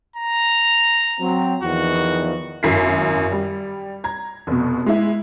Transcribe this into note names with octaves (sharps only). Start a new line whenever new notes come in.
A#5
F#3 C4
E2 D#3 F3 F#4
G#1 F#2 E4 B6 C7
G3
A#5 G#6
F1 B2
G#3 E4